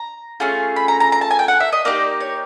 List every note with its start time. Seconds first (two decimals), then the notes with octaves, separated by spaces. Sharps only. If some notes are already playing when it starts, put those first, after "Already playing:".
Already playing: A#5
0.40 A3 C#4 F4 G#4
0.76 B5
0.88 A#5
1.00 A#5
1.12 A#5
1.21 A5
1.31 G#5
1.39 G5
1.48 F#5
1.60 E5
1.73 D#5
1.85 A#3 D#4 G4 D5
2.20 C#5